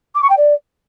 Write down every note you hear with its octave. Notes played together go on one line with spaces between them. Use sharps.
D6
C#6
G5
D5